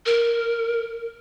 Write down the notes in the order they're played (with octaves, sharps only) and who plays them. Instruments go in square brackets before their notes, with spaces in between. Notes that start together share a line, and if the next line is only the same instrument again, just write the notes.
[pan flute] A#4